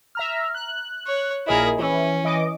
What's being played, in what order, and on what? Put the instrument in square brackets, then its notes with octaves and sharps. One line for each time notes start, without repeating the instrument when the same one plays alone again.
[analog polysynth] E5 A#5 F6
F#6
[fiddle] C#5
[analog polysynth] A#1 A#4 D#5 [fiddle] E4 G#4
[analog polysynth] E3 [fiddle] C#4
[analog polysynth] E3 D#5 D6